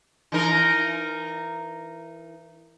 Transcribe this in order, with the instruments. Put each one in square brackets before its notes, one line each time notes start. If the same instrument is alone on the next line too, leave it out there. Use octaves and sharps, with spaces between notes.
[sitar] E3 D#4 A#4